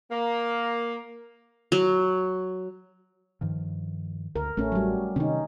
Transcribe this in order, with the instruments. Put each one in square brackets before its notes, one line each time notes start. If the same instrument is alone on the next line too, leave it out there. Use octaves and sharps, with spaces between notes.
[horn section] A#3
[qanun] F#3
[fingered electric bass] G2 D#3 F3
[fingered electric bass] D2 [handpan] A#4
[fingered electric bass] A1 [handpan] A3 C#4
[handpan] F#3 G3
[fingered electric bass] C3 D#3 G3 [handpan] C#4 D#4